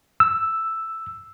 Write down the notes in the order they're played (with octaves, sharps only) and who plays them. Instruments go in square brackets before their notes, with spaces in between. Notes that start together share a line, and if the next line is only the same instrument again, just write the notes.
[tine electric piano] E6